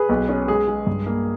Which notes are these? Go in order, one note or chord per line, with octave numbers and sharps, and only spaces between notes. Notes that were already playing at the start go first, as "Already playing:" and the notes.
Already playing: G#4 B4
B1
C#4
G#3 G#4
G#3
G2
A#3